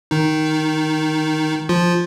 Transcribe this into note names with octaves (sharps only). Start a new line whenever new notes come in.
D#3 D#4
F3 F4